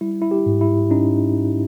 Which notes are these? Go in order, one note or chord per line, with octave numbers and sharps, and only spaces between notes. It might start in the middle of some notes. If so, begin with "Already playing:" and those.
G3 E4
E4
G4
G#2
E4
C#4 D#4